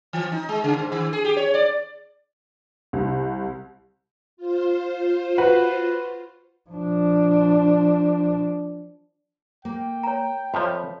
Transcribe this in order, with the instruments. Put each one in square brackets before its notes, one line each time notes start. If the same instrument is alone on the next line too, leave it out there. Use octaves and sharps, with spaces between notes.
[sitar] E3
D#4
G#3
C#3
G#2
D#3
G#4
G4
C#5
D5
[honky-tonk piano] C2
[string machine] F4 C5
[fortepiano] F#4 B4
[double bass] F3 D4
[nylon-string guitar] A#3 [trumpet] G5
[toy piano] C#5 A#5
[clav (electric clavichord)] F2 F3 [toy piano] C#5 B5 [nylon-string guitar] E5